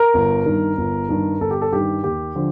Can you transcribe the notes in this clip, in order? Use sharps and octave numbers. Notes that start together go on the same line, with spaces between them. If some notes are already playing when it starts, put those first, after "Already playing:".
Already playing: A#4
G1
G2 D#3
G1
G2 D#3
G1 A4
G4
A4
G2 D#3 G4
D#2 G4
D3 F3